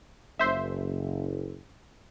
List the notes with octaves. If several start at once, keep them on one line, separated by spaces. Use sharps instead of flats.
F#1 C5 E5